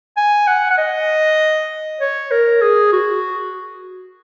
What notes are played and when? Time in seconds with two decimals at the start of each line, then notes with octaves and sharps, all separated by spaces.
0.17 G#5
0.48 F#5
0.71 F#5
0.78 D#5
2.01 C#5
2.31 A#4
2.62 G#4
2.93 F#4